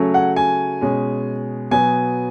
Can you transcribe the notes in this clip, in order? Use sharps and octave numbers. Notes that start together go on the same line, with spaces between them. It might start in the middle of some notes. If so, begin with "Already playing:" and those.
Already playing: C#3 F#3 A3 C#4
F#5
G#5
B2 G#3 C#4
B2 F#3 B3 G#5